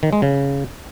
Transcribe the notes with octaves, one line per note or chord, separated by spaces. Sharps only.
D#3
G#3
C#3